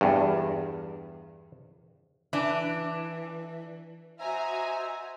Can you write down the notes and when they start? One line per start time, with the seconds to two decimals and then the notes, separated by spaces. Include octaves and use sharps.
0.01 E2 G2
2.33 E3 D4
4.20 F#4 C5 D#5 E5 G#5 A#5